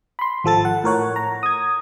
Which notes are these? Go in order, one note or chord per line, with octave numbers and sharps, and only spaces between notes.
B5 C6
G#1 F3 A4 A6
F#5
A2 A#4 C#5 F#5
A#5
D#6 G#6